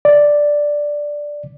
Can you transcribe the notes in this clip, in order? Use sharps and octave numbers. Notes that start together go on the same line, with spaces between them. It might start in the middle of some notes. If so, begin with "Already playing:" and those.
D5